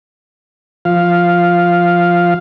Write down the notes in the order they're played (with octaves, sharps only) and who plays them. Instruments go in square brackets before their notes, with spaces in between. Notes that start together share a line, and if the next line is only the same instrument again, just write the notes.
[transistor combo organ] F3 F5